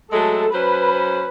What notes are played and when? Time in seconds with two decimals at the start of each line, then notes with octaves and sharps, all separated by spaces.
0.11 F#3 G#3 A3 A4
0.53 F#3 C#4 B4 C5